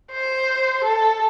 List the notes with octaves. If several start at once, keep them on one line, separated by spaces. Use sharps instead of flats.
C5
A4